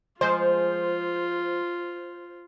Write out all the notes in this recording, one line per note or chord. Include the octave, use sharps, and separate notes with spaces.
F3 G#3 F4 C5